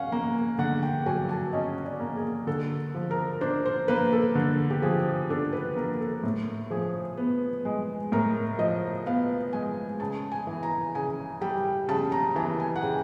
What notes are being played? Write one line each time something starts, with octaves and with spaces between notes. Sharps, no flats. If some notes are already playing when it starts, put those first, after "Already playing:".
Already playing: C#4 F5 F#5
A#3
D3 F#5
G5
F#3 G#5
A5
C#4 D#5
D5
A#3
G#4
D3 A4
F3
A#4
D4 C5
C5
A#3 B4
A4
D3
G4
F3 G#4
D4 A4
B4
A#3 A#4
A4
A2
F3 G#4
B3
G#3
A2 A#4
F3 D#5
B3 F5
G#3 G#5
C#3 A5
G#5
E3
A#5
C#3 G#5
G3 G5
C#3 A5
A#5
E3 A5
G#5
F#5
C#3 G5